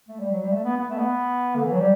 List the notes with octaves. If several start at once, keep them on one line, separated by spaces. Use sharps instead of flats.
A3
G3
F#3
G3
A3
B3
B3
A3
B3
D3
E3
F#3
G3